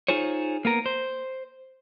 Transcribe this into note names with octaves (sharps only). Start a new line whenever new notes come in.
D#4 F4 G#4 C5 C#5
A#3 B3 A#4
C5